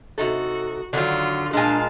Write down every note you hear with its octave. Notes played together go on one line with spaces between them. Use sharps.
C3 D#4 F#4 A4
D3 D#3 F#3 F4
A#2 G#3 D4 F5 G#5 A5